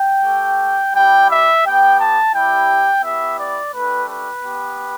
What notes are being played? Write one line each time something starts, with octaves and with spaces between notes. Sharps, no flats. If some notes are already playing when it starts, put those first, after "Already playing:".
Already playing: G5
A3 G4
G3 E4 G4 G5
E5
B3 G4 G5
A5
G3 E4 G4 G5
B3 E4 G4 E5
D5
A3 D4 G4 B4
B4
B3 G4